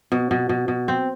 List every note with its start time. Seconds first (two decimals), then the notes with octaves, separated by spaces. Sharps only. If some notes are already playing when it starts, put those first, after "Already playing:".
0.12 B2
0.31 B2
0.49 B2
0.68 B2
0.88 C4